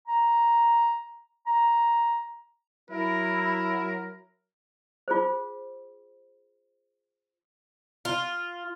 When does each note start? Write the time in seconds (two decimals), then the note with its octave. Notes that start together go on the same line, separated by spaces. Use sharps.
0.08 A#5
1.47 A#5
2.91 F#3 E4 A#4
5.08 F4 G#4 C5
8.05 F4